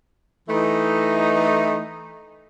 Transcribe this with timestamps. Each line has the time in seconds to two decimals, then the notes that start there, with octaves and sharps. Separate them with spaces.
0.49 E3 A3 D#4